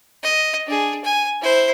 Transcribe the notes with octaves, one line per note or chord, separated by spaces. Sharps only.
D#5
D4 G#4
G#5
E4 C5